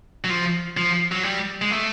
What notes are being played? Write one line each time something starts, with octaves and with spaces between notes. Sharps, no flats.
F#3
F3
F3
F#3
G3
G#3
A3